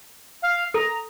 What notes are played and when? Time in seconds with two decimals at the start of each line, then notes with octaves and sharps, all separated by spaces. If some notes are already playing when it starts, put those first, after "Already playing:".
0.42 F5
0.74 A4 A#5